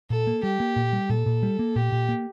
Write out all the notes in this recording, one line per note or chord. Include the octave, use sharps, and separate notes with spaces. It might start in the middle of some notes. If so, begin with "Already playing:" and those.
A#2 A4
A#3
G3 G4
A#3
A#2
G3
A#2 A4
A#2
G3
A#3
A#2 G4
A#2
A#3